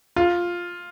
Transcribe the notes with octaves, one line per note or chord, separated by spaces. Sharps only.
F4